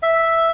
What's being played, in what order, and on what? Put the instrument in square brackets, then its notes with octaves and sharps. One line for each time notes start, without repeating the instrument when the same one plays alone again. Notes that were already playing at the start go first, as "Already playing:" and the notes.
[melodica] E5